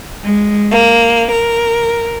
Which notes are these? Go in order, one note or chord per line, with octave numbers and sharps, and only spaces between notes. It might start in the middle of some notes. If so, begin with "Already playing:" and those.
G#3
A#3
A#4